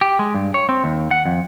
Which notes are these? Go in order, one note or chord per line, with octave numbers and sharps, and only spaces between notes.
G4
G#3
G2
C#5
C4
D#2
F#5
F2